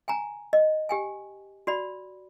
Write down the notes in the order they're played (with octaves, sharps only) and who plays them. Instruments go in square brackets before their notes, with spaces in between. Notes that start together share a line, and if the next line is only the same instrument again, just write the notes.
[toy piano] G5 G#5 A#5
D#5
G4 G5 G#5
F#4 D5 B5